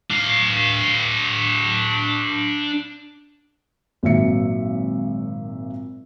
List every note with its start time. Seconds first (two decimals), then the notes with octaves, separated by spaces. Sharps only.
0.11 D4 F5
4.03 G#1 A#2 F#3 E5 C#7